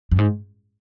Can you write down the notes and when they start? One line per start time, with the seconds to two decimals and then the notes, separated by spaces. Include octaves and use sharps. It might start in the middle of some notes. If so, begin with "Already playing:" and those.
0.11 F#2
0.18 G#2